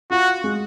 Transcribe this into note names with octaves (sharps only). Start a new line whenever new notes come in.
F4 F#4
G#3